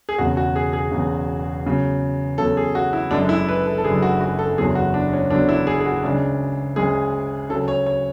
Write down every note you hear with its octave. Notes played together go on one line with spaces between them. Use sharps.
G#4
E1 E2 C#3 F#4
F#4
G#4
G#4
E1 E2 C#3
E2 C#3 F#3
E2 C#3 F#3 A4
G#4
F#4
E4
F#1 F#2 D3 G#3 D4
E4
B4
A4
A4
F#1 F#2 D3 G#3 G#4
F#4
F#4
A4
F#1 E2 D3 F#3 G#4
F#4
D4
C#4
F#1 E2 D3 F#3 D4
E4
G#4
G#4
F#4
D2 C#3 G#3 D4
D2 C#3 G#3 G#4
D2 C#3 F#3 A4
C#5
C#5